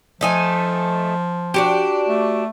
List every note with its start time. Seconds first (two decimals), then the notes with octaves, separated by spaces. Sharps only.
0.21 F3 A3 D#4 G#5
1.54 D4 F#4 G4
2.08 A3